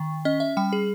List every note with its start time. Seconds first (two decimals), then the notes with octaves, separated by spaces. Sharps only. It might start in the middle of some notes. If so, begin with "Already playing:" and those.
Already playing: D#3
0.25 C#4 D#5
0.40 E5
0.57 G3 G5
0.73 G#4